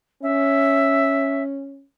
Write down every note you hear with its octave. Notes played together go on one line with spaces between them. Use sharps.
C#4 E5